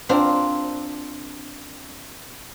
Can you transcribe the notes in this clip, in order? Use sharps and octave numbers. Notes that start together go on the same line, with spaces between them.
C4 D4 F4 A#4 C5